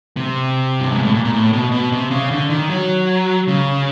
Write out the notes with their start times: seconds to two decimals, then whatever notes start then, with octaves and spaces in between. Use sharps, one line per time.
0.17 C3
0.81 G2
0.91 G#2
1.03 A2
1.14 A#2
1.25 A#2
1.33 A2
1.53 B2
1.72 B2
1.92 C3
2.11 C#3
2.31 D3
2.50 D#3
2.70 F#3
3.48 C#3